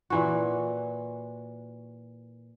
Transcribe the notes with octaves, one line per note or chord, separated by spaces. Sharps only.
A#2 E3 F#4